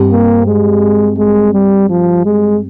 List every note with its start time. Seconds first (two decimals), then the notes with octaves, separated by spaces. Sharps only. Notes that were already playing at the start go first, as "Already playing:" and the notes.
Already playing: G2 G3 C4 G4
0.11 A#3
0.47 G#3
1.17 G#3
1.53 G3
1.89 F3
2.25 G#3